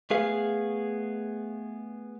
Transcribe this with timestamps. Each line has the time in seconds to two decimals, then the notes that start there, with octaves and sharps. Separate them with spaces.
0.10 A3 B3 G#4 F5